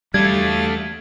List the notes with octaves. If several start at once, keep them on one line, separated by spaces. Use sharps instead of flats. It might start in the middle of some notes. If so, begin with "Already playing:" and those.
E2 G3 A3 D4 F5 G#6 A6